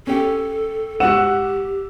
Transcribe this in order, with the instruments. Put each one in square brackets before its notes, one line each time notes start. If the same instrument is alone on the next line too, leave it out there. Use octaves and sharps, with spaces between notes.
[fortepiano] C#4 G4 [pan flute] A4
[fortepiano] G#2 F#4 [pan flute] G4 [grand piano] F#5 E6 E7